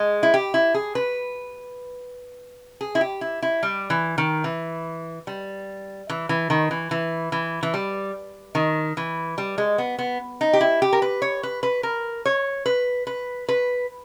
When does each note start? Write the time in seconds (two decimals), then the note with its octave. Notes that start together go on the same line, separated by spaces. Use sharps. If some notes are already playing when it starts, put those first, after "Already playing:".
Already playing: G#3
0.23 E4
0.34 G4
0.54 E4
0.74 G#4
0.95 B4
2.81 G#4
2.95 E4
3.01 G4
3.21 E4
3.42 E4
3.63 G3
3.90 E3
4.18 D#3
4.44 E3
5.27 G3
6.10 E3
6.29 E3
6.50 D#3
6.71 E3
6.91 E3
7.32 E3
7.63 E3
7.74 G3
8.55 D#3
8.97 E3
9.38 G3
9.58 G#3
9.78 B3
9.99 B3
10.41 D#4
10.53 G4
10.61 E4
10.82 G4
10.93 A#4
11.02 B4
11.22 C#5
11.43 B4
11.63 B4
11.83 A#4
12.25 C#5
12.66 B4
13.07 B4
13.48 B4